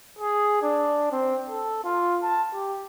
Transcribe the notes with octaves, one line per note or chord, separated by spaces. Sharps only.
G#4
D4
C4
A4
F4
A5
G4